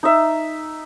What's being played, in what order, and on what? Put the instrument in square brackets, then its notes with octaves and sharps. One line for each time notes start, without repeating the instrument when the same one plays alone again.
[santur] D#4 E5